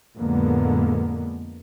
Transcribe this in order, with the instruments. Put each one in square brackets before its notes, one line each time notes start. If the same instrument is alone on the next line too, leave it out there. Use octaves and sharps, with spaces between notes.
[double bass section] F2 A2 D3 G#3 A#3 B3